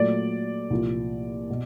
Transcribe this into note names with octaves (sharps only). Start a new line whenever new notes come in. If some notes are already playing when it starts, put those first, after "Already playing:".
Already playing: A#2 F#3 A3 D5
C2 A#2 F3 A#3
B2